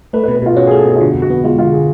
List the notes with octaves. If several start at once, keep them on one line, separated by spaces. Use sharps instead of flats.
A3 B4
B4
B2
B4
B2 F4
C#4 F#4
G#4
A3
A4
B2 G#4
F4
D3 F#4
F2
F#4
B3
G#3 F4
D3 F4
G#4